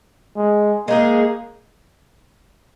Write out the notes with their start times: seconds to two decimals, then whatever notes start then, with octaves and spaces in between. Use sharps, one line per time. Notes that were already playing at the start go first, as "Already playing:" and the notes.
0.37 G#3
0.88 G#3 A#3 D#4 G#4